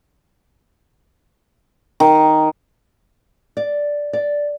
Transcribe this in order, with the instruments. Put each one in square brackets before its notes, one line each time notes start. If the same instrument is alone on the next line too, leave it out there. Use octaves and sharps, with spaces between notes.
[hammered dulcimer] D#3
[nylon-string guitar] D5
D5